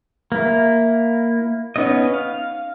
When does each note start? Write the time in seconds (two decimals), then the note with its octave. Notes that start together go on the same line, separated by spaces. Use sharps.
0.32 A#3 E4
1.76 B3 C#4 D#4 D#5
2.14 F5